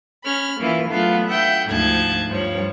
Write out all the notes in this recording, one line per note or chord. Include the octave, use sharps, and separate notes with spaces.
C#4 B5 F6
E3 A#3 E4 F4
F#3 A3 B3 D4 F4
E5 F#5 G5 G6
D2 G#2 F3 A5 F#6 G#6
G2 F3 C#5